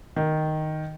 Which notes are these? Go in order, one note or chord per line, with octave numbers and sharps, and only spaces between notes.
D#3